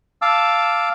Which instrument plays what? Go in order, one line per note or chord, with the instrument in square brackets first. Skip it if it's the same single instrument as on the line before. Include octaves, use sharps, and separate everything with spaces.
[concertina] F5 A5 D6 E6